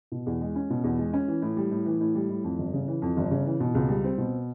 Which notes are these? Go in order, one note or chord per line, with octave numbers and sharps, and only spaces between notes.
B2
E2
G#3
C#4
B2
E2
G#3
C#4
E3
A2
G3
A2
E3
A2
G3
A2
F2
G1
C#3
E3
F2
G1
C#3
E3
B2
C#2
G3
C4
B2